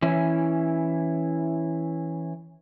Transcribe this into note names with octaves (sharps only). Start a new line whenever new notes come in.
E3 C#4 E4